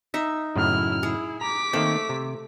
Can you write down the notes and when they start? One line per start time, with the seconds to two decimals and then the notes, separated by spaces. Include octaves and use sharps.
0.14 D#4 E5
0.56 F#2 A2 C#3 E4 F6
1.03 E4 G#4
1.41 A#5 D6 B6
1.73 D#3 A3 A#3 C4
2.09 C3